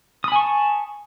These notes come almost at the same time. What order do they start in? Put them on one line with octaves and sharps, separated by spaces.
D#6 B5 G#5 C#6 A5